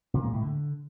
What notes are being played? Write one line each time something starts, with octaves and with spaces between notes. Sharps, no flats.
A#2
G#3
A2
D3